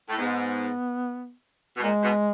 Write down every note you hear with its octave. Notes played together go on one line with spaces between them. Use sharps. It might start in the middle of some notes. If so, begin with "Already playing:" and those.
A2
G#2 B3
B2
A#2 G#3
B2